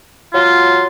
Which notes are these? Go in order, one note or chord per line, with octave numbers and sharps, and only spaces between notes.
F#3 F4